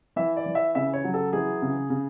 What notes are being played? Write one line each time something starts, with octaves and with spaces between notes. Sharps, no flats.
E3 E5
D5
E3
E5
C#3 E5
C#5
F#3
A4
E3 G#4
C#3
C#3